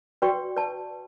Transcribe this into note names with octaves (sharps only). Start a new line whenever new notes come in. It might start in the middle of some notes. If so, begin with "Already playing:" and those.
F#4 B4 D5 G5 C#6
B4 D5 A5